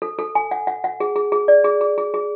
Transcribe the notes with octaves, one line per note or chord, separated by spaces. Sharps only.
A4
A4
G#5
F#5
F#5
F#5
G#4
G#4
G#4
D5
G#4
G#4
G#4
G#4